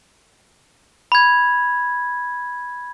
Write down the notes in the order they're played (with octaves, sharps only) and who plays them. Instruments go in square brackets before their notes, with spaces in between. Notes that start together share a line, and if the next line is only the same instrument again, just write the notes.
[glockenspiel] B5 G#6